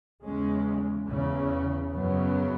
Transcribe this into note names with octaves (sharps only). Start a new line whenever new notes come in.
E2 C#3 G#3 C#4
E2 C#3
F#2 C#3 F#3 B3